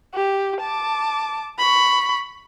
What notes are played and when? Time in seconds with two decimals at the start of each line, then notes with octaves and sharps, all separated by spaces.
0.14 G4
0.60 A5 D6
1.59 B5 C#6